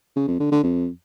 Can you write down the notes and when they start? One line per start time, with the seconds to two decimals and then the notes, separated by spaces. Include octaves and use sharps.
0.16 C#3
0.28 F2
0.40 D3
0.51 D3
0.63 F2